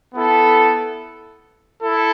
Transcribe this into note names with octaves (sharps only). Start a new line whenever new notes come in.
B3 E4 A4
E4 A4